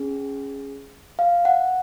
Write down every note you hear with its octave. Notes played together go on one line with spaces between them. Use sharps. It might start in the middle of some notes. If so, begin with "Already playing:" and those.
Already playing: C#4 G#4
F5
F#5